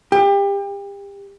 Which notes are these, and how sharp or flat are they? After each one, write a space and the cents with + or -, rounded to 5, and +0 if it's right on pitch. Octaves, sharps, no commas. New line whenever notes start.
G4 +30